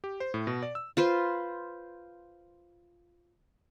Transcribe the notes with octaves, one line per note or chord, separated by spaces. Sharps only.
G4
C5
A2
B2
D5
E6
F4 B4 C5